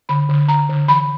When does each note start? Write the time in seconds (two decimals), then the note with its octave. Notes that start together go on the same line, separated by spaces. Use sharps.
0.09 D3 B5
0.29 D3
0.48 D3 A#5
0.69 D3
0.88 E3 B5